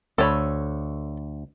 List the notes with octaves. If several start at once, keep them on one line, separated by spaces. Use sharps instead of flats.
D2 A4 C#5 B5